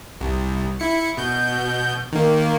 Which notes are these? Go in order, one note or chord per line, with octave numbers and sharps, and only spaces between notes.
C2
E4 C#7
B2 G6
D#3 A#3